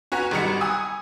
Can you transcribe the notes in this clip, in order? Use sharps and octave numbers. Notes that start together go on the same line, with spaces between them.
C#4 F#4 B4 G#5 A#5 F7
G#1 F#3 G3 D#4 F#4 C#7
G#5 D#6 E6